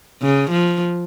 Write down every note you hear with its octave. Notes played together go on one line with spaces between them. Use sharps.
C#3
F3